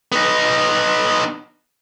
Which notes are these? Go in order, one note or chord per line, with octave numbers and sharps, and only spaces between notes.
B3 D#4